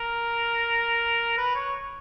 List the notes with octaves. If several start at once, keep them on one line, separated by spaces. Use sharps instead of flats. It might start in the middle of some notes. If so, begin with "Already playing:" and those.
Already playing: A#4
B4
C#5